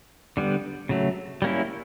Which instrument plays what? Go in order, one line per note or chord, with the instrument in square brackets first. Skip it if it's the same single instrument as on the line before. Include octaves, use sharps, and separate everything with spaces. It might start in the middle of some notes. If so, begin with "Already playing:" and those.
[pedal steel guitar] D3 G3 B3
C#3 F#3 A3
G3 A#3 C#4 E4